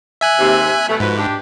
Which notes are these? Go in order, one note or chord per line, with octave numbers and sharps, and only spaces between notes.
E5 G#5 F#6
D#2 G#2 C3
B2 F#3 A3
G#2 F3 F#4 B4
D4 G4